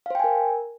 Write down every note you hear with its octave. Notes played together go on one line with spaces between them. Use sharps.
A#4 C5 F5 G5 G#5